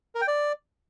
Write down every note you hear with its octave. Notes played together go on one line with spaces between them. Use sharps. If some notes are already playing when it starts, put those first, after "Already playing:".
A#4
G5
D5